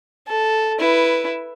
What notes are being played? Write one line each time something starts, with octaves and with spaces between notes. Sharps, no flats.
A4
E4 B4